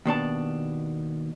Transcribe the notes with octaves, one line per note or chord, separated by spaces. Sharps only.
D#2 B2 D4 A5